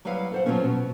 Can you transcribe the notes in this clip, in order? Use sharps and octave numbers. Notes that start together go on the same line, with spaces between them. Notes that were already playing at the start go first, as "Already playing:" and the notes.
F#3 G3 E4 B4 F5 F#5
A4 C5 F#5
F3 F#3 G#3 A#3 B3 C#4
B2